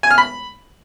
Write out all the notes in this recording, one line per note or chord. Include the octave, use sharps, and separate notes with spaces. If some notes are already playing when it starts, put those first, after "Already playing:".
G#5
F6
B5